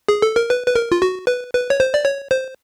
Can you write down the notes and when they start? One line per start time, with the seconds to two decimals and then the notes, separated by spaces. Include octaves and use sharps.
0.08 G#4
0.22 A4
0.36 A#4
0.50 B4
0.67 B4
0.76 A#4
0.92 F4
1.02 F#4
1.27 B4
1.54 B4
1.70 C#5
1.80 C5
1.94 D5
2.05 C#5
2.31 C5